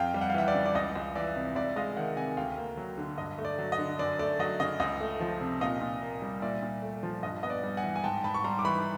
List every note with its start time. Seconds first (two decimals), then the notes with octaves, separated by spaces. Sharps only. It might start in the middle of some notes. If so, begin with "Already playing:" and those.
Already playing: F2 F5 G5
0.14 G3
0.21 F#5
0.30 F5
0.34 E3 E5 F#5
0.48 D5
0.55 C#3
0.66 D5
0.75 C#2 D#5
0.96 C#2
1.15 E3 D5 E5
1.36 C3
1.55 C#2 D5 E5
1.76 G#3 D#5 F5
1.96 D#3 E5 F#5
2.16 C3 F#5 G#5
2.37 D2 F5 G5
2.57 A#3
2.77 F#3
2.98 D3
3.18 G2 D#5
3.38 A3
3.45 D5
3.59 F#3
3.72 D#5
3.79 D3
3.99 F#2 D5
4.19 A3 D5
4.39 F#3 D#5
4.60 C#3 D#5
4.80 C#2 D#5
5.00 A3
5.20 F3
5.41 C3
5.61 A#2 D#5 F5
5.81 A#2
6.02 A#3
6.22 G3
6.42 A#2 D5 E5
6.62 A#2
6.82 A3
7.03 F3
7.23 G2 D#5
7.43 B3 D#5
7.50 D5
7.63 G3
7.77 F#5 G#5
7.84 E3
7.96 G#5
8.04 G#2 G5 A5
8.24 G#2 A5 B5
8.34 C#6
8.44 G3 A#5 C6
8.59 D6
8.65 E3 B5 C#6